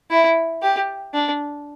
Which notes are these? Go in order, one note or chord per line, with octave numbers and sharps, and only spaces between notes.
E4
G4
D4